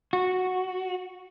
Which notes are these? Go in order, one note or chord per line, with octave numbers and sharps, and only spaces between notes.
F#4